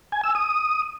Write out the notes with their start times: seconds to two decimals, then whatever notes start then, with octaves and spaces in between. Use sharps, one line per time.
0.12 G#5
0.24 E6
0.35 D#6